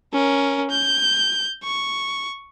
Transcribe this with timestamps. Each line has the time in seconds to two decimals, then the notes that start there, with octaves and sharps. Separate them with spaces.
0.13 C#4 A#4
0.71 G6
1.64 C#6